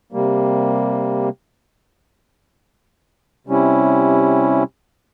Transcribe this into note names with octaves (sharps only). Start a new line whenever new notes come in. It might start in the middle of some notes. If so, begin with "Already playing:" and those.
C3 G3 A#3
C3 G3 C#4 E4